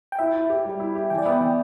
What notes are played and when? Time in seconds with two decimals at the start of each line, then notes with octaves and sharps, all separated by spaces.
0.12 G5
0.19 E4 E5
0.35 E4
0.50 G4
0.65 G3
0.80 E4
0.95 G4
1.10 E3 G5
1.18 D5
1.26 B3 E5
1.41 E3 G5